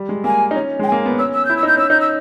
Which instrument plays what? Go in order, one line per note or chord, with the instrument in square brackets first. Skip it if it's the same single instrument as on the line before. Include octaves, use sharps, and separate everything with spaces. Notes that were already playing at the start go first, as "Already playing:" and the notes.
Already playing: [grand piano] G3
G#3
[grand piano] A#3 [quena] G#5
[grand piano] D#4
C#4
[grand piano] G#3 [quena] G5
[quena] G#5
[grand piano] A#3
B3
[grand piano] C#4 [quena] E6
[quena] E6
[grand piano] E4 [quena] G6
[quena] E6
[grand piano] D#4 [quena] G6
[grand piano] C#4 [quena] E6
[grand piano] D#4 [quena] G6
[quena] E6